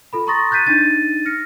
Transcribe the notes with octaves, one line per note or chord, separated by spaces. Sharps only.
F4 A4 B5
A#5 C6 C#6 D#6 A6 A#6
F#6 G6 A6 B6 D#7
D4 D#4 A6 D#7
F6 A#6 C#7